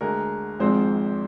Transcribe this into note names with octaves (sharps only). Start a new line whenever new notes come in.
D2 D3 G#3 A#4
G#1 G#2 F3 G#3 C4 C5